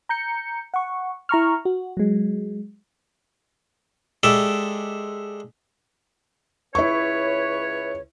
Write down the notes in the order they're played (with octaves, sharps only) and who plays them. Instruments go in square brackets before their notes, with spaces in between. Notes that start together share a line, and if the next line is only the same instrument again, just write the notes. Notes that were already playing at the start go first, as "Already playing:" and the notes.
[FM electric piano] A#5 G6 C#7
F#5 C#6
E4 A#5 C#6 F6
F#4
F#3 G#3
[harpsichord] G#3 G4 A4 D5 E5
[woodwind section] C#2 B4 C#5 [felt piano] E4 C#6